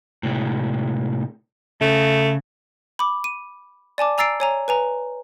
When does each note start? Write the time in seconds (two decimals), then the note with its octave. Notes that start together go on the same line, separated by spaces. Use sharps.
0.23 A2 C3 G#3
1.81 C#3 A3
2.99 B5 D6
3.24 D#7
3.98 D5 G#5 A5 D6
4.18 G#5 A#5 E6 A6 C7 D7
4.40 C#5 G#5 A#5
4.68 B4 G#5 A#5